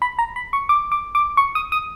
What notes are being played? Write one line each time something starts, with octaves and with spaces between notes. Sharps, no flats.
B5
A#5
B5
C#6
D6
D6
D6
C#6
D#6
D#6